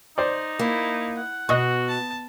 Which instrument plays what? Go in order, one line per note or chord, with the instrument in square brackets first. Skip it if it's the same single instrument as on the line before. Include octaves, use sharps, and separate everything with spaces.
[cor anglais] D#4 [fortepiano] C5 D5
[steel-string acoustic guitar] A#3 [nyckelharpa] E4
[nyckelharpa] F#5
[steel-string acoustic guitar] B2 [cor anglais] F#4 [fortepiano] D#5 C#6
[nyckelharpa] A5